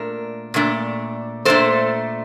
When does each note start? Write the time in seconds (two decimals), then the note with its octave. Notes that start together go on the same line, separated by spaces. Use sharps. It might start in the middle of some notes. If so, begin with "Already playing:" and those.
Already playing: A#2 A3 D4 A#4
0.54 A#2 A3 D4
1.45 A#2 A3 D4 A4 C5